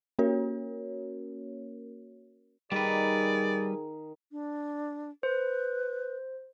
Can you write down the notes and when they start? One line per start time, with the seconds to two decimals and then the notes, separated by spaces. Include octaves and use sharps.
0.19 A#3 C#4 F#4 A#4 C#5
2.72 D#3 G3 G#4 B4 D5
4.32 D4
5.23 B4 C5